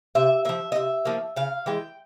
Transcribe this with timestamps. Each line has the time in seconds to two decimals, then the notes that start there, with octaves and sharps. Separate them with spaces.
0.15 C3 E5
0.45 F3 A#3 E5
0.72 D#5
0.75 C3 E5
1.05 F3 A#3
1.36 C#3 F5
1.66 E3 G#3 G5